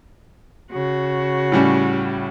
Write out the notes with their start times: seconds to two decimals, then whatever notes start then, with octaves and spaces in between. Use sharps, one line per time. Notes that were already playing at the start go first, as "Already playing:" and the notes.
0.71 C#3 F#4
1.52 A2 G3 C#4